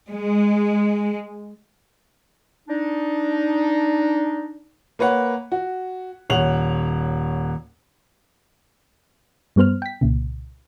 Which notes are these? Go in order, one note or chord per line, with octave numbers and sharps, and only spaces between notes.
G#3
D4 D#4
A#3 B4 C#5 F#5
F#4
D#1 C#5 F#5 F7 F#7
G2 G3 B3 C5 F6
G5 B6
C2 A#2 C#3